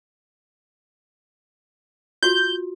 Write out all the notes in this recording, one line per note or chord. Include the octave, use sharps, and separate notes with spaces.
F4 F#4 G6